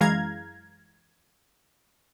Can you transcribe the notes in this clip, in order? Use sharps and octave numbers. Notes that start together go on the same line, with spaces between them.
F#2 E3 G#3 F5 A#5 G#6